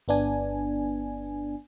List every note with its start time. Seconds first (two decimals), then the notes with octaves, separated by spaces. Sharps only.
0.08 G1 B3 D4 G#5